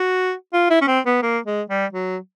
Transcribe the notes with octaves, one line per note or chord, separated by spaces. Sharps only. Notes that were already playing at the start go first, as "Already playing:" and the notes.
Already playing: F#4
F4
E4
C#4
C4
B3
A#3
G#3
G3
F#3